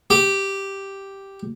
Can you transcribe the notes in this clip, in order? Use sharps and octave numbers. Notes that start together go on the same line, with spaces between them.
G4